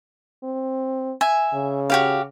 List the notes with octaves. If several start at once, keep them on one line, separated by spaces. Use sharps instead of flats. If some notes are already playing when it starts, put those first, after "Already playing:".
C4
E5 G#5
C#3
F#4 G4 F5